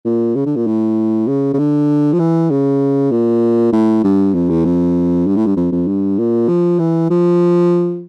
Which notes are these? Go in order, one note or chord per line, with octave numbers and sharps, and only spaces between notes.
A#2
C#3
D3
A#2
A2
C#3
C#3
D3
F3
E3
C#3
A#2
A2
G2
F2
E2
F2
G2
A2
G2
F2
F2
G2
A#2
F3
E3
F3